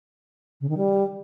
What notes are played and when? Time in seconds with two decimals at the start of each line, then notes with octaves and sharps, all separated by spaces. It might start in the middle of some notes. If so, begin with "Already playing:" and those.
0.61 C#3
0.69 D#3
0.77 G3